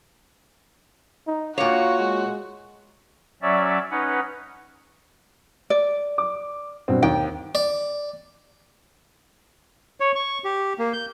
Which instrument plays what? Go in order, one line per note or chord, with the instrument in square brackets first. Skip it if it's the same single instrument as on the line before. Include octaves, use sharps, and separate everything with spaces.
[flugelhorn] D#4
[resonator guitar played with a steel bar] A#2 C#5 [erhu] F#4 [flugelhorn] F5
[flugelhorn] G#3
[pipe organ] F#3 C#4 D5 E5
C#4 D#4 B4 F#5
[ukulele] D5
[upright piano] D6
G2 B2 C4
[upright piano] D#2 [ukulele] G5
[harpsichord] D5
[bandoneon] C#5
C#6
G4
A#3
G6